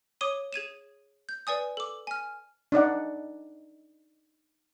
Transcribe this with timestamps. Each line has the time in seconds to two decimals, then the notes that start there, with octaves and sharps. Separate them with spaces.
0.21 C#5 D6 D#6 D#7 G7
0.53 G#4 G#6 D#7 E7
1.29 G6
1.47 B4 D5 G#5 D#6
1.77 A4 D6
2.07 G#5 F6
2.72 D4 D#4 D5 F#5